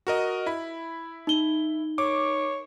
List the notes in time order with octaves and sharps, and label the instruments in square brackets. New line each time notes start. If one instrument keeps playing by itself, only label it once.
[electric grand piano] F#4 A#4 D#5
E4 B5
[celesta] D#4 G7
[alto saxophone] C#5 [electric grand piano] D6